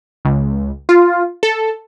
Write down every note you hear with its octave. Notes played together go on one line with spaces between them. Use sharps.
C#2
F4
A4